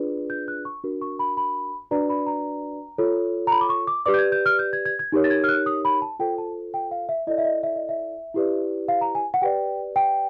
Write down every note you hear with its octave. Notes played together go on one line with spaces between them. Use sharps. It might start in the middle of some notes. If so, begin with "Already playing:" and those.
Already playing: D4 F4 G#4 B4 D5
G6
F#6
C#6
D4 F#4 A#4
C#6
B5
B5
D4 F#4 B4 D5 A#5
B5
A#5
F4 A4 C#5
A#5
B5
D6
C#6
D6
G4 B4 D5 D6
G6
G#6
G6
F6
G6
G#6
G#6
G#6
D#4 G4 A#4 C#5
A6
G#6
F6
F#6
D#6
B5
A5
F4 A4 C5 G5
A5
G5
F5
E5
E4 A4 D5 D#5
E5
D#5
E5
D#5
E5
E4 G4 B4 D5
F5
A#5
G#5
F#5
G4 B4 D5 G5
G5